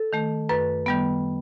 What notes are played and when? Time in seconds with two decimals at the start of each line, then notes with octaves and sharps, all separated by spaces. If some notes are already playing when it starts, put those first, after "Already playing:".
Already playing: A4
0.13 D#3 A3
0.49 F#2 B4
0.86 D#3 G3 B3